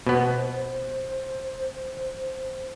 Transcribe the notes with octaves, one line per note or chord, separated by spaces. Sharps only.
B2 B3 C5